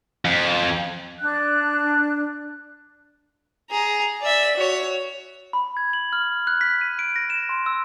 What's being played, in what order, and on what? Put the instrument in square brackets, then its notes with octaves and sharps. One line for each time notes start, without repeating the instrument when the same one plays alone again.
[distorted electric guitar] F2
[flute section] D4 F#6
[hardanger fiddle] G#4 A#5
D5 E5
F#4 C#5
[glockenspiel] B5
G#6
F#7
F6
F#6
B6
D#7
D7
A#6
E7
C6
E6